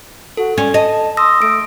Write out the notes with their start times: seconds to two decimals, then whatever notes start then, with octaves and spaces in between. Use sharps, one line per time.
0.37 F#4 A4
0.58 C#4 D5
0.74 D#5 A5
1.17 C6 D#6 E6 A#6
1.42 A3 D7